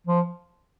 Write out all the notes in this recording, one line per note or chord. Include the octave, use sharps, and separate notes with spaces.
F3